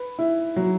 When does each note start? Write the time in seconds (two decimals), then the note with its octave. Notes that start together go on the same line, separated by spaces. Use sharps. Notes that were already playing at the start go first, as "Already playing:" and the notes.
Already playing: B4
0.19 E4
0.56 F#3